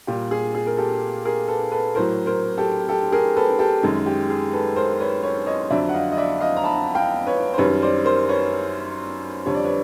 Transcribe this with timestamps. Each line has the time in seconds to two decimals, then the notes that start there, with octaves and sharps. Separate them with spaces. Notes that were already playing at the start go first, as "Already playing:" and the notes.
0.07 A#2 G3 G4
0.31 G#4
0.55 G#4
0.67 A#4
0.77 G4 A4
1.25 G#4 A#4
1.48 A4 B4
1.72 A4 B4
1.95 A2 F#3 A#4 C5
2.26 A#4 C5
2.58 G4 A4
2.89 G4 A4
3.12 G#4 A#4
3.37 A4 B4
3.59 G4 A4
3.83 F#2 D#3 G#3
4.06 G4
4.30 G#4
4.53 A4 B4
4.76 A#4 C5
5.00 B4 C#5
5.23 B4 C#5
5.46 C#5 D#5
5.70 F2 D3 F#3 D5 E5
5.89 F#5
5.94 D#5 F5
6.12 D#5
6.17 D5 E5
6.41 D#5 F5
6.57 A#5
6.64 A5 B5
6.95 F5 G5
7.26 B4 C#5
7.53 C5
7.58 F#2 D#3 G3 B4 C#5
7.82 C5 D5
8.04 A#4 C5
8.28 B4 C#5
9.46 F2 D3 G3 C#5
9.55 D5
9.65 B4 C#5